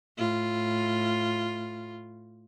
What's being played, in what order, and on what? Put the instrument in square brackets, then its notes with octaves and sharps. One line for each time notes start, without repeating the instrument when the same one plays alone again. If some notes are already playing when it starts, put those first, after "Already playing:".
[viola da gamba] A2 F4